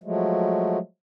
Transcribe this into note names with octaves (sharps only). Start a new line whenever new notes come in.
F3 F#3 G#3 A3